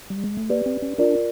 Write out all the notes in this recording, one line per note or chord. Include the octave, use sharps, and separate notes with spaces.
G3
G#3
A3
A#3 G4 B4 D5
C4
C#4
D4 F4 A#4 D5